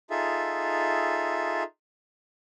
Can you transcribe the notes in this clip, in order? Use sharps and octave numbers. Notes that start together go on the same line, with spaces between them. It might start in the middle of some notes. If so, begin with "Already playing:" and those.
D#4 F4 G#4 A4 E5